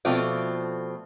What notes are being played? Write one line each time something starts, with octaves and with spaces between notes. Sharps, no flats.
B2 F3 A3 C4 F4 D5